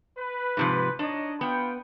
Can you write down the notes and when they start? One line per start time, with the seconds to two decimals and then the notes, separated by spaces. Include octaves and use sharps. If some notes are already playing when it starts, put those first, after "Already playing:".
0.18 B4
0.57 G#2 C3 F3
0.99 D4 D#4 C#5 D#5
1.41 B3 F4 G5